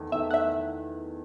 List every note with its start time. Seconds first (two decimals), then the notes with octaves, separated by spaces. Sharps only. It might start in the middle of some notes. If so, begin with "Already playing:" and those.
Already playing: E2 D#3 A3
0.12 E2 D#3 A3 E5
0.31 F#5
0.34 E5